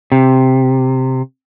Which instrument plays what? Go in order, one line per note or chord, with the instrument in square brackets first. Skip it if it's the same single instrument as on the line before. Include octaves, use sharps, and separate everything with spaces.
[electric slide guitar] C3